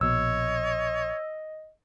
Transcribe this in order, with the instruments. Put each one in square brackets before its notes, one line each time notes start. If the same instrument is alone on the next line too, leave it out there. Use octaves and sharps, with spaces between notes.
[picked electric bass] A#1 B2 [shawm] C#5 [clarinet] D#5 [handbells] E6